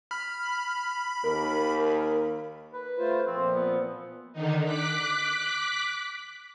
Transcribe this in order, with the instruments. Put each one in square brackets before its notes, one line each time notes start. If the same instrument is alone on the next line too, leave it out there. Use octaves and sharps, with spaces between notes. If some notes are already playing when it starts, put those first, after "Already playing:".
[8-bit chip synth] B5 [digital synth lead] F6
[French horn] D#2 [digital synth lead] A#4
[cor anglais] B4
[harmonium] A3 F4 C5
[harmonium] A#2 F3 [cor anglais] C4
[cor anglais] B3
[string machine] D3 D#3 D#4
D6 F#6 B6